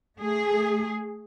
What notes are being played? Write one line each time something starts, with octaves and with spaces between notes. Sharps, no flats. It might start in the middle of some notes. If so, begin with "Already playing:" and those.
A3 G#4